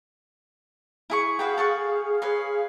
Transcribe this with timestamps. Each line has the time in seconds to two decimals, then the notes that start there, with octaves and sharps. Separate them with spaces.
1.10 E4 G#4 C#6
1.39 F#4 G#4 B4 F5 G5
1.58 A4 F#5 C#6
2.22 B4 C#5 C6